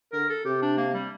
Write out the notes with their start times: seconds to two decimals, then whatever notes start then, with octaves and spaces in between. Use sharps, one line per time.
0.13 D3 A#4
0.29 A4
0.45 C3 G4
0.62 D4
0.77 A#3
0.94 G3